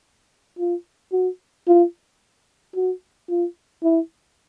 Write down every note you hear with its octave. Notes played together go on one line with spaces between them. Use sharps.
F4
F#4
F4
F#4
F4
E4